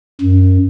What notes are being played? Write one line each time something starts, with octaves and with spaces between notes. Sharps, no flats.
F#2